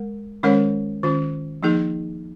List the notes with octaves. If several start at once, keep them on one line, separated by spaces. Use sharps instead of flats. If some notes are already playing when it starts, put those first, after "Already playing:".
Already playing: G#3 A#4
D#3 G#3 C#4 A#4 C#5
D#3 C#4 F4
F3 A#3 D#4 G#4